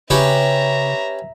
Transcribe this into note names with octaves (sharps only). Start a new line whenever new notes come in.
C#3 C#4 G4 B4 E5 A#5